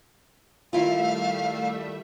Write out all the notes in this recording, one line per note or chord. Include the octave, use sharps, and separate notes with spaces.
D#3 G3 A3 E4 F4 E5 F5